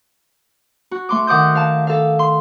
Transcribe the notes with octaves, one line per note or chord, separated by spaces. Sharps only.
F#4
A3 C6 D6
D#3 F#5 D6 D#6 G6
F5 A5
A4 F5
C6